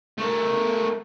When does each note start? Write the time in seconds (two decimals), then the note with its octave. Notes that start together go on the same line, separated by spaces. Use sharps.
0.18 A3 A#4